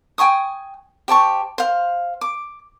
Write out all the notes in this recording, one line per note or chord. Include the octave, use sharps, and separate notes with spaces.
G5 G#5 C#6 D#6
G4 C5 A5 C#6
C5 F5
D6